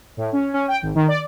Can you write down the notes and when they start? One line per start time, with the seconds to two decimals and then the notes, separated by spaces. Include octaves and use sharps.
0.17 A2
0.33 C#4
0.54 C#4
0.68 G5
0.82 G#1
0.95 D#3
1.08 D5